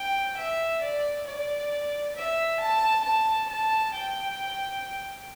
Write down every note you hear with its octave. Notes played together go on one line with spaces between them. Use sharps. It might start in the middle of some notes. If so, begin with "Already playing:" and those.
Already playing: G5
E5
D5
D5
E5
A5
A5
A5
G5